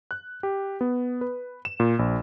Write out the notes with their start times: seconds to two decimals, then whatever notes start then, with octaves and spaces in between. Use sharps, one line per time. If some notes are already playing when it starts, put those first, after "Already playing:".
0.11 F#6
0.43 G4
0.81 B3
1.21 B4
1.65 E7
1.80 A#2
1.99 A#1